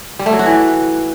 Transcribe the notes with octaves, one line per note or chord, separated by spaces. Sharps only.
G3
A3
F#3
F#4
E3